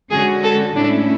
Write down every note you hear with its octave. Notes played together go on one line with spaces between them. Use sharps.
D3 G#3 C#4 F#4 G#4
A4
A2 G#3 C#4 D4 E4